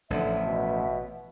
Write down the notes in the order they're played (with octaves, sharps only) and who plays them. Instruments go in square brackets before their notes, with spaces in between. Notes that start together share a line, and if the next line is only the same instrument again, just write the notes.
[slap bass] A1 F3 [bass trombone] D3 [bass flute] E5
[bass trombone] B2